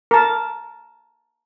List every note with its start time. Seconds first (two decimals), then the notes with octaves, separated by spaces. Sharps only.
0.11 A#4 A5